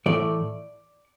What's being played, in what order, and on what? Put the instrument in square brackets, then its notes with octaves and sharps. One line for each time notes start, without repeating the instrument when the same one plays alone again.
[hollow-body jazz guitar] A2 E3 A3 D5